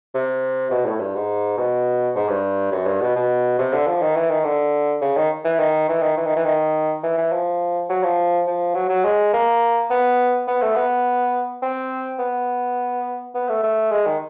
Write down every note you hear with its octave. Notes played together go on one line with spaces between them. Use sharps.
C3
B2
A2
G2
G#2
B2
G#2
G2
F#2
G2
B2
B2
C3
D3
F3
D#3
E3
D#3
D3
C#3
D#3
E3
D#3
E3
D#3
E3
D#3
E3
D#3
E3
E3
F3
F#3
F3
F3
F#3
F#3
G#3
A#3
B3
B3
A3
B3
C4
B3
B3
A3
A3
G#3
D#3